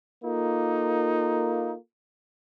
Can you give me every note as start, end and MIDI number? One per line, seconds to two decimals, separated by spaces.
0.24 1.75 58
0.24 1.74 63
0.24 1.75 65
0.24 1.75 69